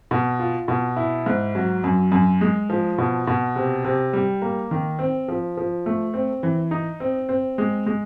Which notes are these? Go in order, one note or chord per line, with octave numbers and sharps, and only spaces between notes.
B2
F4
B2
E4
G#2
F#3
F#2
F#2
G#3
F3
B2
B2
C3
C3
G3
A#3
D#3
C4
F3
F3
A3
C4
E3
D#4
C4
C4
G#3
G#3